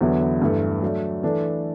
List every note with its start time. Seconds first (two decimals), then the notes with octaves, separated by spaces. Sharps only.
0.01 E2 D3 F#3 B3 E4
0.42 G2 E3 A3
0.82 F#3 A3 D4
1.23 E3 A3 D4 A4